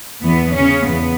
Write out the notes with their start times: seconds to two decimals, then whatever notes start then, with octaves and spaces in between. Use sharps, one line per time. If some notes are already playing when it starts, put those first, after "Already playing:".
0.23 E2 E3 B3
0.55 C#3 C#4
0.86 E2 B3